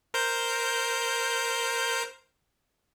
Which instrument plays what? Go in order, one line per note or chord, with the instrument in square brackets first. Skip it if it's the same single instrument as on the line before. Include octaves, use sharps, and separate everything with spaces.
[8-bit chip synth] A#4 C5 G6